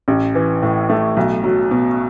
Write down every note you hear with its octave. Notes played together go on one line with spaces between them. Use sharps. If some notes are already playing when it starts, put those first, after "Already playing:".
A1
E3
A2
A3
B1
F#3
B2